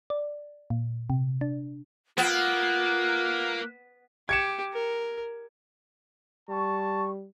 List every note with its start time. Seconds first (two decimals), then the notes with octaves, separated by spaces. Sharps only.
0.10 D5
0.70 A#2
1.10 C3
1.41 D4
2.18 A#3 B3 F4 F#6
4.29 G4 G#6 C#7 E7
4.73 A#4
6.49 G3 A5 C#6